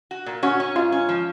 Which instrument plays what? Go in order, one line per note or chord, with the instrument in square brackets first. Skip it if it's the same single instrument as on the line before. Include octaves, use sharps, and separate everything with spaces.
[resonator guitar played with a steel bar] F#4
A#2
[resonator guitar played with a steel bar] C#4 [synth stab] F#4
[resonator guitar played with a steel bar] C#4
[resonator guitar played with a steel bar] G#2 [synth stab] F4
[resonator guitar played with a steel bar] C#4
F3